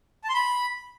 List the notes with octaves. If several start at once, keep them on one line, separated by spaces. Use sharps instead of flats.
A5
C6
B5